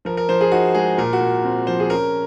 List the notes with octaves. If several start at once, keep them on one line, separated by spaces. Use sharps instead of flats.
F3 A#4
A#4
F3 C5
G#4
D#4 F#4
G#3 G#4
A#2 A#4
F#4
A#2
C4
F3 C5
G#4
C#4 A#4